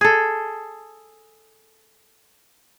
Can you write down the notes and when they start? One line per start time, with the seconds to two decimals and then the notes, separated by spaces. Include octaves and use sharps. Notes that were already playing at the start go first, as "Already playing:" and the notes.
0.01 G#4 A4